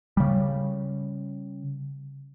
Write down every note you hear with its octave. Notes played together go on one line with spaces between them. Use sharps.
C#3 G3